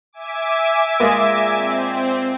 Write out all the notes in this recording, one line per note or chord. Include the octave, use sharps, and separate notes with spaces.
E5 G#5 D6
A#2 G#3 G#4
C4